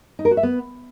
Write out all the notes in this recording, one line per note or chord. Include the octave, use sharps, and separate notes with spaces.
D#4
A#4
F#4
E5
B3